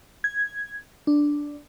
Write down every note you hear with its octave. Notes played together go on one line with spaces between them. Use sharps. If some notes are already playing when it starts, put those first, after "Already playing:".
G#6
D4